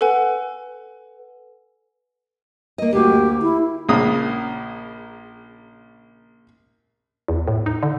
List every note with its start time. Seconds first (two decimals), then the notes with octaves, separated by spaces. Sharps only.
0.01 A4 B4 F#5 G#5
2.78 A#3 D#5
2.93 D2 A#3 F#4 G4
3.42 E4
3.89 A#1 C#3 A#3 D#6
7.28 E2
7.48 A2
7.66 D#4
7.83 D3